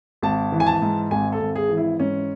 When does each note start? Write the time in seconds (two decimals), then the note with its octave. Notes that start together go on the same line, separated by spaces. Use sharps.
0.23 G#1 A5
0.52 E3
0.60 G#5
0.67 A5
0.82 G#2
1.11 G#1 G#5
1.32 A4
1.40 G#1
1.56 G#4
1.69 E3
1.77 E4
1.99 G#2 C#4